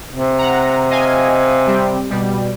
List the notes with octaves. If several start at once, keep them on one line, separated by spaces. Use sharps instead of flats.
C3
F#5 A#5
D#5 F5 G#5
G3 C4 G4
B2 G3